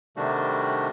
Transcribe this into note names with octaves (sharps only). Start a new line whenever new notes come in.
C3 D#3 G3 A3 D4 F#4